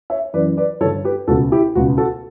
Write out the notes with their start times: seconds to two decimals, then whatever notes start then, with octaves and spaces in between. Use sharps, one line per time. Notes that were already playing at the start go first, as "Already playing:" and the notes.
0.10 C#5 E5
0.33 F#2 E3 B4 D5
0.57 B4 D5
0.80 G2 A4 C#5
0.85 D3
1.04 G4 B4
1.27 C#2 B2 F#4 A4
1.52 E4 G4
1.75 C#2 B2 F#4
1.98 F#4 A4